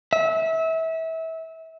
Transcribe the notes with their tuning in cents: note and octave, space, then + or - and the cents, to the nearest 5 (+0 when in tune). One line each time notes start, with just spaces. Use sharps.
E5 -25